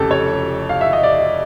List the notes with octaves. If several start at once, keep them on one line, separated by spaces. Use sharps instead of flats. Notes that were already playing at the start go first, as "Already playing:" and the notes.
Already playing: F1 F2 C#3 G4 A4
C#5
F5
E5
D#5
D5